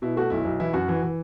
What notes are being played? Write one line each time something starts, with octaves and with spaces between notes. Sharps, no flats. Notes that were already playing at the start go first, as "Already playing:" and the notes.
B2 E4
A3 F#4
B1 E4
B1
E3 E4
F#2 F#4
E3
E3